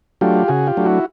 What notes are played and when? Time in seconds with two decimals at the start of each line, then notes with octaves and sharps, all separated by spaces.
0.21 F#3 A3 D4 F4 G4
0.48 C#3 F#4 G#4
0.67 F4 G4
0.77 F#3 A3 D4
0.85 E4 F#4